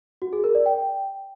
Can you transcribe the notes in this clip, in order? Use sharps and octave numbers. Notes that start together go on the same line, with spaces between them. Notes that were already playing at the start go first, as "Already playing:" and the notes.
F#4
G#4
A#4
D5
G5